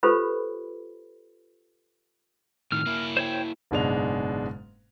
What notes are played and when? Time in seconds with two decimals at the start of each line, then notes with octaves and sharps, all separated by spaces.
0.03 F4 G4 A4 B4 C5 B5
2.72 A2 D#3 F6
2.86 A#3 E4
3.17 C5 C#5 G5
3.71 F#1 G#2 B2 G#3 D4 F7